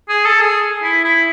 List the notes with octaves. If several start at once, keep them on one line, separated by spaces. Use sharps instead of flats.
G#4
A4
G#4
E4
E4